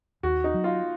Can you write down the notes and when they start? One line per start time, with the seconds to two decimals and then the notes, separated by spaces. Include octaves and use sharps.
0.23 D#2 F#4
0.44 D#4
0.54 F#3
0.64 F4